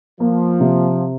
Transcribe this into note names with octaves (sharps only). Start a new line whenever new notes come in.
F3 A#3
C3